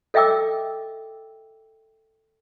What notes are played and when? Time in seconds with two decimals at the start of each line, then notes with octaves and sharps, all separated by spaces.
0.14 A4 D#5 E5 G5 D6 E6